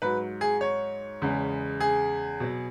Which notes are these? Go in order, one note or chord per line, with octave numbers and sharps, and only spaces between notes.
G#2 F#3 B4
G#4
C#5
E2 C#3 G#3
G#4
B2 F#3